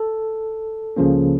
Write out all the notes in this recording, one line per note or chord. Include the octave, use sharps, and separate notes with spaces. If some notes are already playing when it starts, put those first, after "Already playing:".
Already playing: A4
C#2 C#3 F3 A#3 C#4